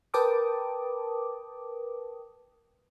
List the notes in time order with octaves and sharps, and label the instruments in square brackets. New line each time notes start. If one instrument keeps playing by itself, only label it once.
[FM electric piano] A#4 B4 G5 A5 D6 D#6